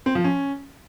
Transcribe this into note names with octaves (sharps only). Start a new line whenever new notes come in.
C4
F3
C#4